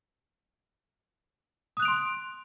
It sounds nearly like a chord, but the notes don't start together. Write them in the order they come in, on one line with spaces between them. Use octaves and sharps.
D#6 F#6 F7 D7 C6